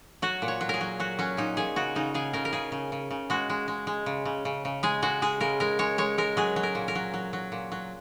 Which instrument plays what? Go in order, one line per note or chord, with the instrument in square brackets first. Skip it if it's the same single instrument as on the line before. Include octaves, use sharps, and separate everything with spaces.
[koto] F#3 F#4
A#2
C#5
F#3
G#4 A#4
F#3
F#3 F#4
F#3 C#4
A#2 D#4
A#2 G#4
C#3 F#4
C#3 D#4
C#3 G#4
C#3 A#4
A#4
C#3 G#4
C#3
C#3
C#3
G#3 F#4
G#3
G#3
G#3
C#3
C#3
C#3
C#3
G#3 G#4
G#3 F#4
G#3 G#4
C#3 A#4
G#3 A#4
G#3 C#5
G#3 C#5
G#3 A#4
F#3 G#4
F#3
A#4
A#2
A#4
F#3
F#3
F#3
A#2
F#3